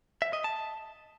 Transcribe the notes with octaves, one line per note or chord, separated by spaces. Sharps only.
E5
D#5
A5